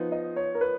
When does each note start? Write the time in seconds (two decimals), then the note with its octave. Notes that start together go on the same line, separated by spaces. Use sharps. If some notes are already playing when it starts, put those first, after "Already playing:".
Already playing: F3 B3 D#4
0.12 D#5
0.36 C#5
0.55 A#4
0.61 B4